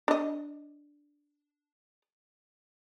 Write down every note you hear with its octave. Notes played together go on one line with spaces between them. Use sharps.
D4 D#5